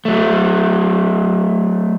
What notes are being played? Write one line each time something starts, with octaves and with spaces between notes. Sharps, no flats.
F#3 A3